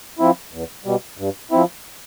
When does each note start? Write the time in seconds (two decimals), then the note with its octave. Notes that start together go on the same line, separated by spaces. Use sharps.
0.19 F3 C4 E4
0.53 E2
0.85 B2 G3
1.18 G2
1.52 F3 C4 E4